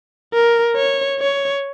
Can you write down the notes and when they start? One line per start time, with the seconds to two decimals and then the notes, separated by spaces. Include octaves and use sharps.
0.34 A#4
0.76 C#5
1.20 C#5